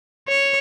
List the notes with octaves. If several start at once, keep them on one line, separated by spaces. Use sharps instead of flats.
C#5